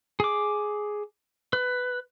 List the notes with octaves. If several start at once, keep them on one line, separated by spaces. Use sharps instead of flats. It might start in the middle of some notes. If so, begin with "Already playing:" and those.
G#4 D6
B4